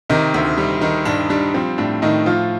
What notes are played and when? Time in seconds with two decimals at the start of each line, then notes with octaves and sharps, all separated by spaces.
0.09 C3 D#3 D#4
0.34 D2
0.58 G3
0.81 D#3 D#4
1.05 G2 D4
1.30 G3 D4
1.54 F3 C4
1.78 A2 D4
2.02 A2 D#3 D#4
2.26 F3 F4